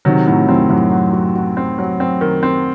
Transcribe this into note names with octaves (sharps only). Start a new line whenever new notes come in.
C3 D#3 F#3
A2 C3 F#3
F#2 A2 C4
F#2 A2 F#3
F#4
F#4
F#4
C4
F#3
C4
D#3
C4